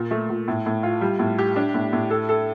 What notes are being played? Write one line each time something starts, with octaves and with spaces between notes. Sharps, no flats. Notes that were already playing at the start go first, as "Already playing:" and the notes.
Already playing: A#2
A3
A#2
A2
A2
F4
G3
A2
G4
D4
A2
A2
A4
A4